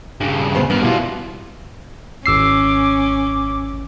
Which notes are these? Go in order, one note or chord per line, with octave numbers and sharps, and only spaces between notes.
G2 C#3
D2 B3 C5
G2 B3 A#4
B2 G3 E4 F4
G#1 C#4 D6 E6 C7